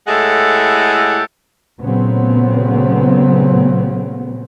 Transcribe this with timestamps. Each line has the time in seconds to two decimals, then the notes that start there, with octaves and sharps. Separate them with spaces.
0.07 A2 G#3 E4 G4 A4 F#5
1.82 A#2 C#3 F#3 A3 B3 C4